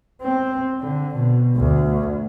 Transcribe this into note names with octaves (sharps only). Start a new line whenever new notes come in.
C4
D3
B2
D2